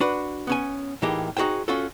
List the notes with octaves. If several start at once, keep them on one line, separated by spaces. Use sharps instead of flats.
D4 F#4 B4
B3 C#4 G#5
A2 E3 A#3 D#4 G4 G#4
D#4 F#4 G#4 C5 G5
C#4 F4 F#4 A4